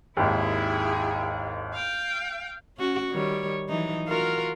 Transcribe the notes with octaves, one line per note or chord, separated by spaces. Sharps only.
G#1 D#2 E4 G#4
F5 G5
C#4 F#4
D#3 G3 C#5
E3 F#3 D#4
F4 F#4 A#4